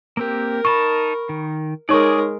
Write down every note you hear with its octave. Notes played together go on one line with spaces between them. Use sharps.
A#3 C4 G4 A#4
D#4 A5 B5 C#6
D#3
G#3 D#4 G#4 A#4 C#5 D5 C#6